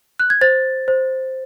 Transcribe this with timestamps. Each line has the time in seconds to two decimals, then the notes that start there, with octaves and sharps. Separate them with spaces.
0.19 F#6
0.30 G#6
0.41 C5 A6
0.88 C5